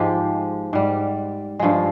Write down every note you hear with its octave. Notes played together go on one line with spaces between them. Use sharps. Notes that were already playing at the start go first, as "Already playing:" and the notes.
Already playing: G#2 F3 G#3 G4
G#2 G3
G2 F3 G#3